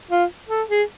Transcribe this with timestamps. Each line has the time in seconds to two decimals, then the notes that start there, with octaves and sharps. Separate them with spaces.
0.11 F4
0.49 A4
0.69 G#4